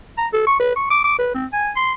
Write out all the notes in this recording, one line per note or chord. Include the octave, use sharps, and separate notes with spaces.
A#5
A4
C#6
B4
C#6
D6
D6
B4
C4
G#5
C6